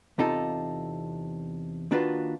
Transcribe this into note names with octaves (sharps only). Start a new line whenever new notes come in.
E2 C3 D#4 F4 A4
D#3 A#3 D4 F4 F#4 B4